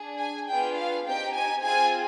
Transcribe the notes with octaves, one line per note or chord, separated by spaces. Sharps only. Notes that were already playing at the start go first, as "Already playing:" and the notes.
Already playing: D4 G#4
G#5
B3 D4 F4 G#4 G5
F5
C4 D#4 G4 G5
G#5
C4 F4 G#4 G#5